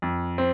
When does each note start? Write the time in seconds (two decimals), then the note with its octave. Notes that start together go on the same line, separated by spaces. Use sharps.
0.02 F2
0.38 C4